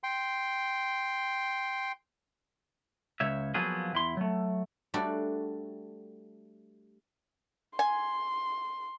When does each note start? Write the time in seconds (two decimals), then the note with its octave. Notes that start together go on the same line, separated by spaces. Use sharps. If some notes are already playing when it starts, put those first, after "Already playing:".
0.04 G5 C6
3.20 C#2 C#5 E5
3.54 F3 F#3 A#3 B3 G#4
3.93 E2 E4 C6
4.17 F#3 A3
4.94 G3 A3 D4 F#4 A4
7.79 G#5 C6